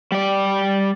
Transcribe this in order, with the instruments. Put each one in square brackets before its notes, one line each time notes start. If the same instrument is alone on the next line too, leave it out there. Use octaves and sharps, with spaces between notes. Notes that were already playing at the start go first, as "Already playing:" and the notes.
[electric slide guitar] G3 D5